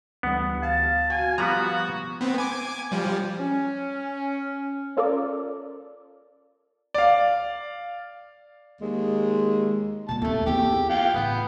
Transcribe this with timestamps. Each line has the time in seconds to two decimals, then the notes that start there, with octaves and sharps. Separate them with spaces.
0.23 D2 E3 G3 B3 F#5
0.62 F5 A5
1.10 F#4 G#5
1.38 F3 G3 B3 F#4 A#5
2.21 B3 C4
2.38 G#5 D6
2.92 F3 G3
3.39 C#4
4.97 C#4 F4 A4 A#4 D5
6.94 D5 F5
8.80 D#2 G#3
10.09 A#2 G3 A5
10.22 D#2 A3 A#3
10.46 E2 A#3 G4
10.72 E4
10.89 F4 G5
11.14 A2 E3 B3